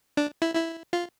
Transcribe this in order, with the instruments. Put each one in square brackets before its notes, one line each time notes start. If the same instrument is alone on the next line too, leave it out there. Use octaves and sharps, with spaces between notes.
[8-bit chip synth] D4
E4
E4
F4